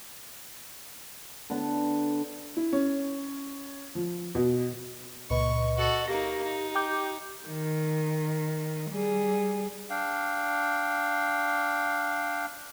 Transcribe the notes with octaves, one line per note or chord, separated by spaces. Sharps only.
D3 B3
E4
C#4
F3
B2
C#2 A#2 B4 D#5 C#6
F#4 A4
A#3 D#4 G4 A#6
D#4
G5 D6 G6
D#3
G3 G#4
D4 F5 G5